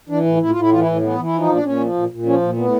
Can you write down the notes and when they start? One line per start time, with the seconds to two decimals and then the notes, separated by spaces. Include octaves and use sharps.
0.09 E3 D4
0.25 A2
0.40 A2 E4
0.50 F4
0.56 A2 E4
0.70 E3 F4
0.81 E4
0.86 A2
1.02 E3 B3
1.17 E3
1.23 E4
1.33 F3 D#4
1.48 A#2 D4
1.64 A#2 C#4
1.80 F3
1.95 A#2
2.10 A#2
2.26 F3 C#4
2.41 A#2
2.57 A2 B3